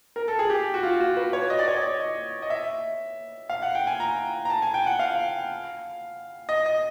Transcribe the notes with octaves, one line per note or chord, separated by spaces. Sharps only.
A#4
A4
G#4
G4
F#4
F4
F#4
B4
C#5
D#5
D5
C#5
D5
D#5
D#5
E5
F5
F#5
G5
G#5
A#5
A#5
A5
G#5
G5
F#5
F5
D#5
D#5